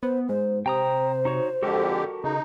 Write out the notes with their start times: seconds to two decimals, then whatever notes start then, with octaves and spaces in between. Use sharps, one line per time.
0.03 B3 C5
0.29 G#2 C5
0.66 C3 C5 G5 A#5 D#6
1.25 D#4 F#4 C#5
1.63 F2 D3 G#3 F#4 G4 A4 A#4
2.24 C#3 D#4